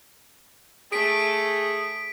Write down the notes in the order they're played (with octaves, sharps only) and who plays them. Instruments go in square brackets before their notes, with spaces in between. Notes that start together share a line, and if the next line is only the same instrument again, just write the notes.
[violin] A3 [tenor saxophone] G#4 [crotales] B6 D7